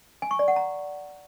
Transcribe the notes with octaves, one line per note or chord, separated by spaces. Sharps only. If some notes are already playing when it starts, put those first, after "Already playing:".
G#5
C#6
D5
F#5
A#5